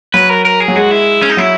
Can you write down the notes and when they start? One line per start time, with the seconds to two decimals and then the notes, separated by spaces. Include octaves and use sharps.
0.14 F#3 B4
0.29 A#4
0.45 A#4
0.60 G#4
0.68 F#3
0.76 G#3 F#4
0.91 E4
1.22 C#4
1.30 D#4
1.37 F#3 E4